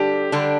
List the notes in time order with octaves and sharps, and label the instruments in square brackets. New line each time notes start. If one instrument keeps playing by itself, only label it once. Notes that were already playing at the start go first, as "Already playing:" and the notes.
Already playing: [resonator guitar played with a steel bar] D3 G3 D4 [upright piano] G4
[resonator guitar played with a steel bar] D3 G3 D4